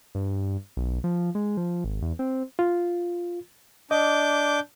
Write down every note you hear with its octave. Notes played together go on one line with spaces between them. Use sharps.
G2
B1
F3
G#3
F3
G#1
E2
C4
F4
D4 D#5 D6 G6